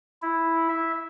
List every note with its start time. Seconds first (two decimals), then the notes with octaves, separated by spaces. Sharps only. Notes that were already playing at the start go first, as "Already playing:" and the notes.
0.22 E4
0.69 E5